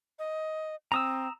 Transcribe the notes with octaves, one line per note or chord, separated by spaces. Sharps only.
D#5
C4 A#5 D#6 E6